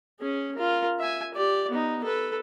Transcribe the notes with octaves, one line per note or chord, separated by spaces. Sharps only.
C#4 G#4
F4 A#4
E5 G#5
G4 D5
B3 D#4
A4 B4